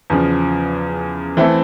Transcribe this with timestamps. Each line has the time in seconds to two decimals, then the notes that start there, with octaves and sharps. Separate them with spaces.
0.10 E2 C#3 F3
1.37 E3 A3 C4 E4 A4